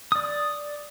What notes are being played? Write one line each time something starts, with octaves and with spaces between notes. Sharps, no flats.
D5 D#6